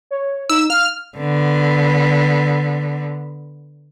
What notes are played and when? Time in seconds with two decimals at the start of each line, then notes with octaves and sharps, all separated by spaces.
0.11 C#5
0.50 D#4 E6
0.70 F5 F6
1.18 D3 B3